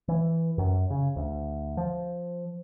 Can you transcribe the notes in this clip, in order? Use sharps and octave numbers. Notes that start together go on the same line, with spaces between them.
E3
F#2
C#3
D2
F3